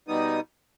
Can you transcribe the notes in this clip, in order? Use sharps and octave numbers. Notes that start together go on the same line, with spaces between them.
B2 G3 B3 D#4 D#6